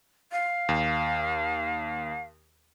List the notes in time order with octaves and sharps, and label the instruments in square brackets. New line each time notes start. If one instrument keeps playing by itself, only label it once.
[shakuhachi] F5
[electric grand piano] D#2